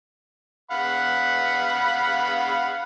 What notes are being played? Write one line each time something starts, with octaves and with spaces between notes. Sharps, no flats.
F5 F#5 B5